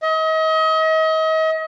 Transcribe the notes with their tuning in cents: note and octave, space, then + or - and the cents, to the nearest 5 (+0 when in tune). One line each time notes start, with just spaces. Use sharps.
D#5 +35